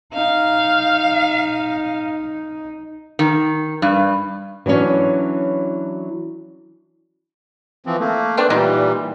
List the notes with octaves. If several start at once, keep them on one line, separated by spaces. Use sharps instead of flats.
D#4 F5
D#3
G2
E3 F#3 G3 C#4 D4
E3 F3 C4
A3 A#3
B3 C4 D4
A#2 E3 F#3 G3 D#4 G4